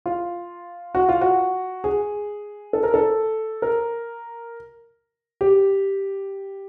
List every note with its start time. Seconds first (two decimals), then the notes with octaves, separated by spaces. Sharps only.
0.06 F4
0.95 F#4
1.09 F4
1.21 F#4
1.84 G#4
2.73 A4
2.83 A#4
2.94 A4
3.62 A#4
5.41 G4